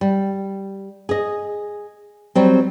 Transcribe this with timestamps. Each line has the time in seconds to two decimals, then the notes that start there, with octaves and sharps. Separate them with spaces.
0.01 G3
1.09 G#4 D#5
2.35 F#3 G3 C4